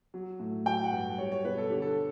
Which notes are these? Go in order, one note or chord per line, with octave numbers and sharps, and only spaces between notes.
F#3
A2
F#3 G5
F#5
G2
G3 C#5
C#5
B2 B4
A4
D3 G4
A4